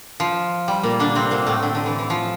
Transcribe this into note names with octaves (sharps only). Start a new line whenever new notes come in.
F3
G3
A#2 A#3
D3 D4
C3 C4
A#2 A#3
A2 A3
D3
D3
E3
E3
F3